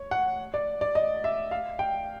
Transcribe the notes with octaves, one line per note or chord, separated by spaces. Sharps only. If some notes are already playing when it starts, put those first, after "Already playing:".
Already playing: C#5
F#5
D5
D5
D#5
E5
F5
G5